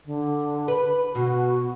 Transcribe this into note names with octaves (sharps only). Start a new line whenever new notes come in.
D3
B4
B2 F#4